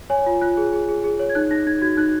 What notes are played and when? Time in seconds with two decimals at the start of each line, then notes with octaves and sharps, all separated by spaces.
0.10 C#5 G#5
0.26 F4
0.41 F4 F#6
0.57 G#4
0.73 G#4
0.89 G#4
1.04 G#4
1.19 C#5
1.30 G#6
1.35 D#4 F#6
1.51 D#4 A#6
1.67 D#4 G#6
1.82 F#4 G#6
1.97 D#4 F#6